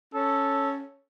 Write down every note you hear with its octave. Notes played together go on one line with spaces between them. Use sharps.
C#4 A4